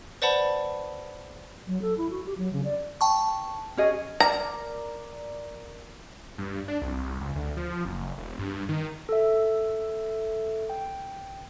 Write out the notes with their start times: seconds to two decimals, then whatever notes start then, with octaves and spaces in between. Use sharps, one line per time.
0.22 B4 C5 D5 F#5 A5 B5
1.67 F#3
1.82 A4
1.97 E4
2.11 F#4
2.26 G4
2.38 F#3
2.53 C#3
2.65 D5
3.01 G5 A5 C#6
3.77 C#4 G#4 D#5
4.20 A#4 D5 A#5
6.38 G2
6.68 D4
6.82 C2
7.21 C#2
7.35 D2
7.57 F3
7.85 F#1
8.18 E1
8.39 G2
8.69 D#3
9.09 A4 E5
10.70 G5